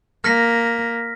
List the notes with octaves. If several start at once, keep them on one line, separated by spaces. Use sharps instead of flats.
A#3 F6 A#6 B6